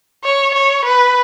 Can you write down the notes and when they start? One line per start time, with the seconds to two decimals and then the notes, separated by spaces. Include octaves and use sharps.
0.24 C#5
0.54 C#5
0.85 B4